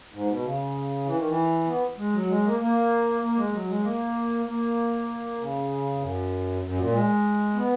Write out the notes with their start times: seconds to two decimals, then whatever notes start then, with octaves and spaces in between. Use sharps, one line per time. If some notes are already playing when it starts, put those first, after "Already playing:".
0.12 G#2
0.27 B2
0.43 C#3
1.05 E3
1.16 D#3
1.27 E3
1.67 B3
1.97 G#3
2.13 F#3
2.29 G#3
2.45 A#3
2.59 A#3
3.21 A#3
3.37 G#3
3.53 F#3
3.68 G#3
3.83 A#3
4.46 A#3
5.38 C#3
5.95 E2
6.00 F#2
6.62 F#2
6.78 A#2
6.93 G#3
7.54 B3